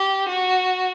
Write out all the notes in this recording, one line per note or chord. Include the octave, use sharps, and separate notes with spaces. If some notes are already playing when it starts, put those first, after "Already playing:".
Already playing: G4
F#4